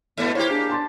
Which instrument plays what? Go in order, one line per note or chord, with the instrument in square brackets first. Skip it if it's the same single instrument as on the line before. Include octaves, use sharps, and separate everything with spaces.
[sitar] G#2 B2 [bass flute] B3
[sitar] A#3 G4 [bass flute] E4 [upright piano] C5 C#5
[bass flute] D4 [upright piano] G#4
[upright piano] A5 C6 A6